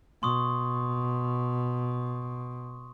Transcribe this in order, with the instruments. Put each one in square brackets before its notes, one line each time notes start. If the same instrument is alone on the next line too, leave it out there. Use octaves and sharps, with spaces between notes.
[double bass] B2 [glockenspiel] C6 C#6 D#6